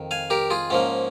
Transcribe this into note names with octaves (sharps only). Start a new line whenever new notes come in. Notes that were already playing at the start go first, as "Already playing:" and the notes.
Already playing: F2 D#3
F5 G#5
G4 A#4
F4 G#4
G#2 F3 A#3 C#4